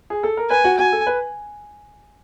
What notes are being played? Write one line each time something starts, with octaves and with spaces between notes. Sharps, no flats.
G#4
A4
A#4
B4 G#5
F#4
F#4 G#5
A4
B4